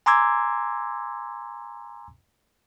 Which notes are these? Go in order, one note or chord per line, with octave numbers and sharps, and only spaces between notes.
G#5 A#5 C6 D6 E6 G#6